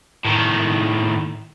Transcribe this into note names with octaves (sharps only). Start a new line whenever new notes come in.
A2 D#3